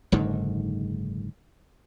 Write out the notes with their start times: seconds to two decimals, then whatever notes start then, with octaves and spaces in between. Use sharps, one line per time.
0.12 F#1 G#2 D3 D#3